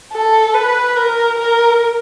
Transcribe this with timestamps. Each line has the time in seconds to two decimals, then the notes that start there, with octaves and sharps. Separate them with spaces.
0.13 A4
0.54 B4
0.97 A#4
1.38 A#4